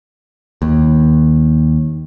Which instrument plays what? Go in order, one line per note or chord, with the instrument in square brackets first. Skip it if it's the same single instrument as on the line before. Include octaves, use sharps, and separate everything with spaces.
[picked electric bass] D#2